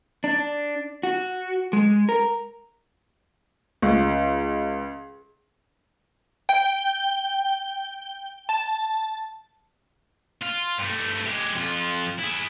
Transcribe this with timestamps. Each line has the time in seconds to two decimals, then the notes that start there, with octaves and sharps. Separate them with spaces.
0.24 D4
1.03 F#4
1.73 G#3
2.09 A#4
3.82 C#2
6.49 G5
8.49 A5
10.43 F4
10.79 G2 A3
11.26 G#3 G4
11.55 F2 F4
12.19 E4 G#4